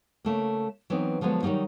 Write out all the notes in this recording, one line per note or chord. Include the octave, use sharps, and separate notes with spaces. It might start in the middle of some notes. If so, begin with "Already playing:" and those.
C#3 A3 A#3
E3 F#3 B3 C4 D#4
D3 F3 F#3 G#3 B3
D#3 F#3 G3 A#3 D#4